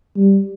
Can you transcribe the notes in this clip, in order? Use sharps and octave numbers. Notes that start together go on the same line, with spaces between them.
G3